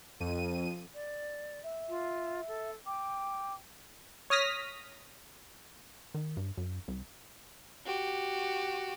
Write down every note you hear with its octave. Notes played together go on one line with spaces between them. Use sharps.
F2 D#7
D5
E5
F4
A4
G5 D6
C#5 D#6 F6 A#6 B6
D#3
G2
F#2
C2
F#4 G4